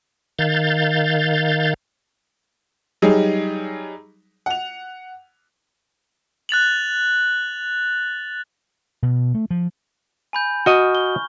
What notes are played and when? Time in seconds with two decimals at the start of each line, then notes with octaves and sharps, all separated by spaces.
0.39 D#3 F5 G6 A6
3.02 F#3 G3 D#4 G#4
4.46 F#5 F7
6.49 F#6 A6 F7 F#7
9.03 B2
9.34 A3
9.50 F3
10.33 G#5 B5 G6
10.66 F#4 D#5 C#6 F6
10.95 G7